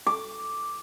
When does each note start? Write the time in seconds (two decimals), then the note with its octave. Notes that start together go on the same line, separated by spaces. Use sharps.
0.07 D6